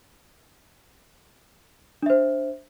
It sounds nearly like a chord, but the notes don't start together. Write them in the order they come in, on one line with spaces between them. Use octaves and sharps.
D4 E5 C5